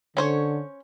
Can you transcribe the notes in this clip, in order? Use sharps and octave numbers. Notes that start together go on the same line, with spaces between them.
D3 C#4 C5 C#5